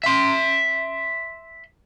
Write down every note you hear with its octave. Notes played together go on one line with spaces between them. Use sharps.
E5 C6